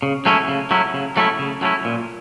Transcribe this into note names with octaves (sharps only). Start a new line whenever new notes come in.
C#3
F#3 A3 C#4 E4
C#3
F#3 A3 C#4 E4
C#3
F#3 A3 C#4 E4
C#3
F#3 A3 C#4 E4
A#2